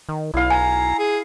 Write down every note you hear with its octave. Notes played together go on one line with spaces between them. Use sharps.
D#3
B1 E4 F5
G#5 A#5
G#4